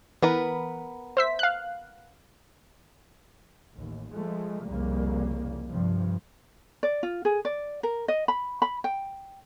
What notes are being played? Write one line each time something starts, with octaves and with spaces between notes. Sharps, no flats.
E3 B3 A#4 B4
C5 E5 B6
F5 F#6
A1 D#2
F3 G#3 A3
C2 F2 C#3 G3 A#3
G2 C3 F3
D5
F4
G#4
D5
A#4
D#5
B5
B5
G5